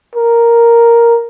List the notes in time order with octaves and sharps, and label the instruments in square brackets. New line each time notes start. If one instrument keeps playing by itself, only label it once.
[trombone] A#4